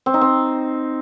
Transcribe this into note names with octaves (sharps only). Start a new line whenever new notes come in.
C4
D#4
C4